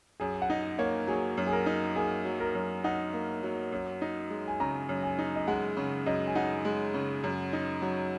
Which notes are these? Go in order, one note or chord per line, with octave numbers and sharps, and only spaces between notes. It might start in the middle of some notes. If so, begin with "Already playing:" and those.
F#2 G#4
F#5
D#4 D#5
A#3 C#5
F#3 G#4
F#2
G#4
A#4
D#4
A#3 G#4
F#3
A#4
F#2
D#4 F#5
A#3
F#3
F#2
D#4
G#3
G#5
C#3 A#5
F#2
G#5
D#4
D#5
G#3 F#5
C#3
F#2 D#5
G#5
D#4 F#5
G#3
C#3
F#2
D#4
F#3